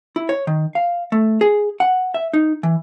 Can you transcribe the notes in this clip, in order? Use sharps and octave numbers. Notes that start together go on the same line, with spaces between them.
E4
C#5
D#3
F5
A3
G#4
F#5
E5
D#4
E3